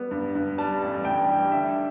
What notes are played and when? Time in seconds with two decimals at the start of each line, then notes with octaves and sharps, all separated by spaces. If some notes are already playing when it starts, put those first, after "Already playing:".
Already playing: G3 B3
0.11 G2
0.35 G2
0.58 G3 A5
0.82 A1
1.05 A1 G5
1.29 G3
1.52 D3 E5